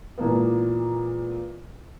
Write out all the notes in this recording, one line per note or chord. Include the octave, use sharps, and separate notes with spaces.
A#2 E3 G#3 A#3 B3